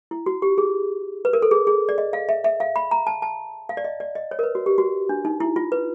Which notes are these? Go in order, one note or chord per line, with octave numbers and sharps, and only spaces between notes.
E4
F#4
G4
G#4
B4
A#4
A4
G#4
G#4
D5
D#5
F5
E5
E5
F5
B5
A#5
A5
A5
F5
D5
D#5
D5
D#5
C#5
A#4
B4
F#4
G4
F#4
D4
D#4
E4
F4
B4